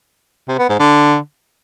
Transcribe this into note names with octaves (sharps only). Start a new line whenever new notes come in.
C3
B3
G#2
D3